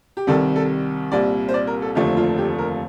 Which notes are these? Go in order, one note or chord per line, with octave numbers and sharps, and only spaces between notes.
G4
C2 C3 D#3 G3 A4
A4
C2 A#2 G3 D5
C5
D5
A#4
A4
F1 D#2 D3 F3 A3 G4
F4
G4
A#4